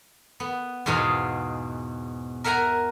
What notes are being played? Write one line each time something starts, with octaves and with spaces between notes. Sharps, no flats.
B3
E2 G#2 B2 G#4 D#5 F5
A#4 E5 F#5 G#5 A#5